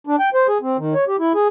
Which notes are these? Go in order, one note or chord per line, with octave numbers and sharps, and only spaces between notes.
D4
G5
C5
G#4
C4
D#3
C#5
G4
E4
G#4